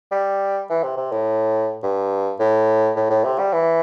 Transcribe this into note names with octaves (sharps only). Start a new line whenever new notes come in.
G3
E3
C3
C3
A2
G2
A2
A2
A2
C3
G3
E3